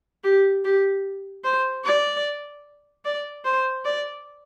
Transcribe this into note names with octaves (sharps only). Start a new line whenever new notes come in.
G4
G4
C5
D5
D5
C5
D5